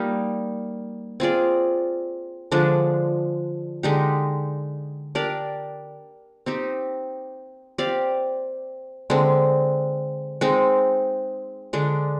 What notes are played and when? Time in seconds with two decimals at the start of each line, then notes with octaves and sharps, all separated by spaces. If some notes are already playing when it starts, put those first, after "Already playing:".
Already playing: G3 A#3 D#4
1.20 C4 F4 G#4 D5
2.51 D3 F3 G#3 D4
3.83 D3 G#3 D#4 G4
5.15 D4 G4 A#4 D5
6.46 C4 D#4 G4 C5
7.78 C4 G4 D5 F5
9.10 D3 G#3 C4
10.41 G#3 C4 D#4
11.73 D3 G#3 D4